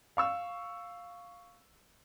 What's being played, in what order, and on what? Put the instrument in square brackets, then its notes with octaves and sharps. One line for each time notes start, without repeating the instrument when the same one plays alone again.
[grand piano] F5 C#6 E6